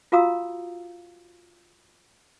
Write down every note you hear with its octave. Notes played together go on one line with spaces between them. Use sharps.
F4 F#4 F5 A#5 D#6 E6